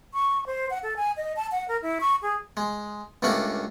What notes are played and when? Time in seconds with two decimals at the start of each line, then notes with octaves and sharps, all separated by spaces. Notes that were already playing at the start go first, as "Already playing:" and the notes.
0.14 C#6
0.47 C5
0.70 F#5
0.83 A4
0.96 G#5
1.17 D#5
1.36 A5
1.52 F#5
1.68 A#4
1.82 E4
2.01 C#6
2.22 G#4
2.57 G#3
3.22 C#2 G2 A3 A#3 D4 F#5